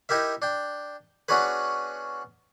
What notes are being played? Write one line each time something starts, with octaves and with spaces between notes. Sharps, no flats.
D#4 E4 G4 A#4 E5
D4 G5
B3 C#4 D4 F#4 G#4 B4